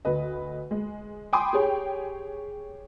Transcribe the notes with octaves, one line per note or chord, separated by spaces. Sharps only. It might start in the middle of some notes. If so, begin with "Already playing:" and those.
D2 B4 D#5
G#3
G5 G#5 B5 C6 D6 D#6
G4 G#4 C#5 G5